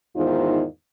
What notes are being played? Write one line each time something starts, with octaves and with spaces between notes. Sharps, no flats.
E2 G#2 D#3 D#4 F4 C5